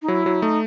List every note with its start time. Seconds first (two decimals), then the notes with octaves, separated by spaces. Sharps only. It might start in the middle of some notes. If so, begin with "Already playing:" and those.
0.02 D#4
0.08 F#3 E4
0.26 F#3
0.42 A3 D#4